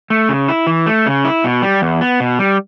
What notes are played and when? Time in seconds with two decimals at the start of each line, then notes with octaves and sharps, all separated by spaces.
0.10 A3
0.29 C#3
0.49 E4
0.67 E3
0.86 A3
1.06 C#3
1.25 E4
1.44 B2
1.62 G3
1.82 E2
2.01 B3
2.20 B2
2.39 G3